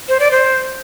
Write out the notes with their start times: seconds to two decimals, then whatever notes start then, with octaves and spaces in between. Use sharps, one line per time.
0.08 C5
0.20 D5
0.31 C5